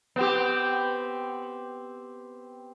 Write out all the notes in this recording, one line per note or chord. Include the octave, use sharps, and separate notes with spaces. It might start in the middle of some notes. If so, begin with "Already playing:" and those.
B3 C4 G4